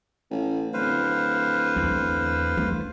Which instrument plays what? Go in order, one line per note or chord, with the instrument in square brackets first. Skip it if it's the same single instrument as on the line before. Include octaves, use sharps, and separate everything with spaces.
[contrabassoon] A1
[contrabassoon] D1 [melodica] B4 C5 F5
[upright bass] E2
A3